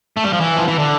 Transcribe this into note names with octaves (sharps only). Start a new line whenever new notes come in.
A3
G3
F3
E3
F3
E3
D3